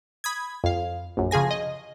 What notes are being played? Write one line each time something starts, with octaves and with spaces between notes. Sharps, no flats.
B5 D#6 G#6
F2 F5
A#1 F#2
C#3 F3 G#4 G#5 A#6
D#5